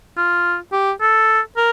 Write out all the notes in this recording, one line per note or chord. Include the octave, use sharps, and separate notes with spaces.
F4
G4
A4
A#4